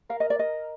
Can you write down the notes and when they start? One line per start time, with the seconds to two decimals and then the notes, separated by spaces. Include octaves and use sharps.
0.09 A#4 F5
0.20 D#5
0.30 D5
0.39 D#5